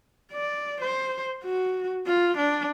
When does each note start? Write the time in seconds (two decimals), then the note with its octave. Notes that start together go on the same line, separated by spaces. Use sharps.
0.32 D5
0.81 C5
1.44 F#4
2.07 F4
2.37 D4